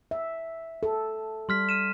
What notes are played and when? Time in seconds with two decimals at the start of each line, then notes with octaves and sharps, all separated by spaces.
0.11 E5
0.83 A4
1.49 G3 C6 F6 B6
1.69 F6 D#7 E7